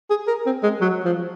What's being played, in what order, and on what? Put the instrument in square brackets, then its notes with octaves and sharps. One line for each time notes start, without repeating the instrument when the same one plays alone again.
[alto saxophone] G#4
A#4
C4
G#3
F#3
F3